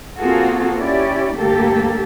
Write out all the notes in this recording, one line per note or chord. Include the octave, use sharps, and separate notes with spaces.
A#3 C4 F4 F#4 G#4 A4
C#4 E4 G4 D5
D2 G2 A#3 G4 A4